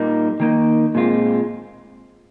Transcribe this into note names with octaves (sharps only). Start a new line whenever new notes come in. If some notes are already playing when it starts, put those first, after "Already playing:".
Already playing: A#2 G3 A#3 D#4
D#3 A#3 D#4
A#2 G#3 C4 F4